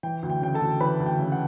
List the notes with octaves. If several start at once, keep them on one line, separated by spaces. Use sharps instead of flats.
E3 G5
D2
G5
C#3 G5
A4 A5
D2
E3 B4 B5
D2
G5
C#3
F#5